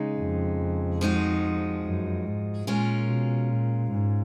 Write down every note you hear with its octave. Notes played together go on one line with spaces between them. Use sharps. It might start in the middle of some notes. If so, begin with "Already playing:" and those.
Already playing: C#3 G#3 D#4
F2
F3 G#3 D#4 F#4
F#2
G#2
A#2 G#3 C#4 F4 A#4
B2
A#2
G#2